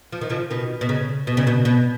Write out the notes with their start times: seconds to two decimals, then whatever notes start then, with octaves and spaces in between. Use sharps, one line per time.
0.12 F3
0.21 D#3
0.29 C#3 F3
0.50 B2 D#3
0.81 B2
0.89 C#3
1.27 B2
1.37 C#3
1.47 B2
1.65 B2